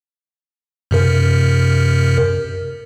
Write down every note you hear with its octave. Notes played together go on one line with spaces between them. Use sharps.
F#2 C3 A#4